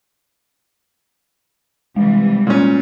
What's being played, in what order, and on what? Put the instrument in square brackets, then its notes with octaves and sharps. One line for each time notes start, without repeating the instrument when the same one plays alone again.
[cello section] C3 E3 G3 [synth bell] G#3
[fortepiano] A#2 C#4